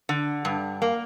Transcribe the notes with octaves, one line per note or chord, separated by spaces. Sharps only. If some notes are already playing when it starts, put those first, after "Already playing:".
D3
G2
A#3